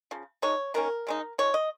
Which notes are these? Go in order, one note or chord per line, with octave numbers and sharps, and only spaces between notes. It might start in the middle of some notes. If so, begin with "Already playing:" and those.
C#3 F3
F3 G#3 D#4 C#5
D#3 A#3 C#4 A#4
C#3 G#3 D#4
F3 G#3 D#4 C#5
D#5